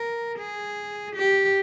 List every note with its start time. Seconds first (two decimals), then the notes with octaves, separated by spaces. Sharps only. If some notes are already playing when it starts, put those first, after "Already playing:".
Already playing: A#4
0.39 G#4
1.15 G4